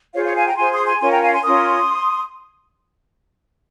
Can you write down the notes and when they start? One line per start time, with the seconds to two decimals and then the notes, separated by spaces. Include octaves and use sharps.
0.14 F4 G#4 C5 C#5 F5
0.24 C#5 F5
0.35 F5 G#5
0.46 G5 A#5
0.56 F4 G#4 C5 G#5 C6
0.71 C6 D#6
0.86 G#5 C6
1.00 C#4 F4 A#4 C#5 G#5 C6
1.11 G5 A#5
1.22 F5 G#5
1.32 G#5 C6
1.43 C#4 F4 A#4 C6 D#6